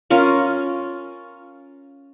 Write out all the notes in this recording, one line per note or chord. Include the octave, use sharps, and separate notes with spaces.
C#4 F4 A#4 C#5